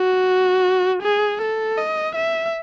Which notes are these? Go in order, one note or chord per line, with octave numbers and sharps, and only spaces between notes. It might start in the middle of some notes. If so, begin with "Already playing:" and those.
Already playing: F#4
G#4
A4
D#5
E5